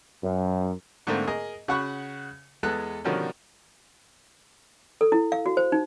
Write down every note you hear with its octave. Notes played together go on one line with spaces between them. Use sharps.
F#2
G#2 D3 A3 A#3 C4
G#4 A#4 D#5
C#3 F#4 F#5 B5 C#6
E2 G#3 B3 A4 F#6
B2 D3 D#3 F3 G3 C#4
A4
E4
F5
F#4
C5
D#4